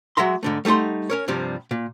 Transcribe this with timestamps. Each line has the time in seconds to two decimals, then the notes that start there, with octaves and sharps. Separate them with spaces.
0.17 F#3 G#3 E5 A#5 C6
0.43 G#2 D3 A3
0.65 G3 A3 D#4 F#5 C6
1.10 C#4 A#4 C#5
1.28 G2 C3 F3 G3
1.71 A#2